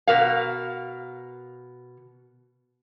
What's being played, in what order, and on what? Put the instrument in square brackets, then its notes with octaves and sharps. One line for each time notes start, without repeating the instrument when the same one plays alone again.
[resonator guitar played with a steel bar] B2 A#4 F5